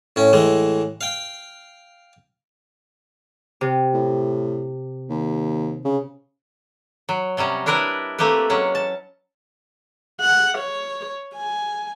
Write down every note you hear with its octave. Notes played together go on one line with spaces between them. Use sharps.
A2 C#4
A2 E3 G#3
F5 G5
C3
A2
D#2
C#3
F#3
C3 F#3 G3 C#4
D4 E4 A#4 B4 D#5
A3 A#3 C4 G4 B4
F#3 G#3 C#4
A5
F#5
C#5
G#5